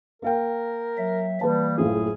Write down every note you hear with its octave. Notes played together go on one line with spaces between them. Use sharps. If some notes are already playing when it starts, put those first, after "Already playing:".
A#3 A#4 F5 G5
F#3 E5
E3 G3 A#3 B4 A5
F#1 A2 F4 G#4